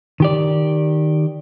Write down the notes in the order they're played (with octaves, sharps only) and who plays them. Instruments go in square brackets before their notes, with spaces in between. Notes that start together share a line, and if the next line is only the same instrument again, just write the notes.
[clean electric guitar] D#3 G4 D5